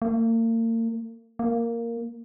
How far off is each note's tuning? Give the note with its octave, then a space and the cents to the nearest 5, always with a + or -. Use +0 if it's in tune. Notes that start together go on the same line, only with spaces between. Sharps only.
A#3 -40
A#3 -5